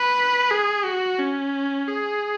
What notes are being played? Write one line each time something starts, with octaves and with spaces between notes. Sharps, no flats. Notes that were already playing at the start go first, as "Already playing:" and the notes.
Already playing: B4
G#4
F#4
C#4
G#4